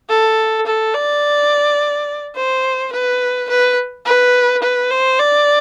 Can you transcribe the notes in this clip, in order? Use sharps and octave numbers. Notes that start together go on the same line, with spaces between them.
A4
A4
D5
C5
B4
B4
B4
B4
C5
D5